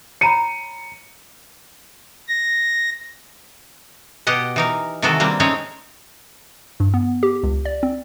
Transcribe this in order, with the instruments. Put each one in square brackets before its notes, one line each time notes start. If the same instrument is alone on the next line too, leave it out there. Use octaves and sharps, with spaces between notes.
[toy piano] C#5 A#5 B5 [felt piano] C#7 D#7
[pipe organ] A#6
[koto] B2 G4 D#5 F#5
E3 D#4 A#4
C3 D#3 E3 G#3 F#4 A4
G3 A#3 C4 D4
G#3 A3 C4 C#4 D#4 C#5
[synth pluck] G2
B3
G4
C#2
D5
C4